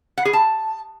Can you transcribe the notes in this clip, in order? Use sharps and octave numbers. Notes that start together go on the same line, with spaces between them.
F#5
G#4
A5